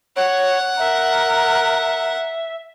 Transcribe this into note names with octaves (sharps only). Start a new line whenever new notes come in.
C#5 F#5
A#4 E5